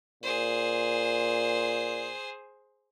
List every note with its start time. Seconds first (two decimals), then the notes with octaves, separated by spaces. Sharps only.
0.23 A#2 G#4 C5